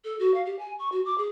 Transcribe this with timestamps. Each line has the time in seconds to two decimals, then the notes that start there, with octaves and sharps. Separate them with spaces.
0.05 A4
0.19 F#4
0.34 F5
0.46 G4
0.59 G#5
0.79 C#6
0.92 F#4
1.05 D6
1.18 G#4